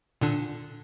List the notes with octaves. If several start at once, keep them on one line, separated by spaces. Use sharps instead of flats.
A#2 D3 D4